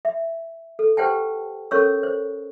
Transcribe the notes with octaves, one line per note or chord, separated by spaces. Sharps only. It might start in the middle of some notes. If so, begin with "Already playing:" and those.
E5
A4
G4 B4 C5 F#5 G5 A5
C#4 A4 A#4 C#5 C#6 E6
C5